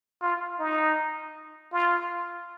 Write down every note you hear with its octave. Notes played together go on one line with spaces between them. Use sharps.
F4
D#4
F4